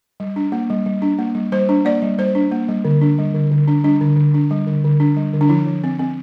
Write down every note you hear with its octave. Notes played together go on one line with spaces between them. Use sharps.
G3
D4
A#3
G3
G3
D4
A#3
G3
G3 C5
D4
A#3 D5
G3
G3 C5
D4
A#3
G3
D3
D4
G3
D3
D3
D4
G3 D4
D3
D3
D4
G3
D3
D3
D4
G3
D3
D4
F3 E4
F3
C4
C4